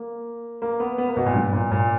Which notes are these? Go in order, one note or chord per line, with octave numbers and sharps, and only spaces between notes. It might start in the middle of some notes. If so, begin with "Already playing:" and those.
Already playing: A#3
A#3
B3
B3
A#3
B2
A#2
G2
A#2
A#2